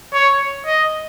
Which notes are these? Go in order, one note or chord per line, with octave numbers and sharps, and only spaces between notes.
C#5
D#5